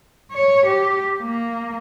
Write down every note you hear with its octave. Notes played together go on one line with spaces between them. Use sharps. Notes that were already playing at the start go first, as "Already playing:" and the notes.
C#5
G4
A#3